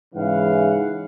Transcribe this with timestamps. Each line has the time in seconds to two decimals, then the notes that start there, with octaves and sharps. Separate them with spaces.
0.15 G#2 C#3 E3 F5 F#5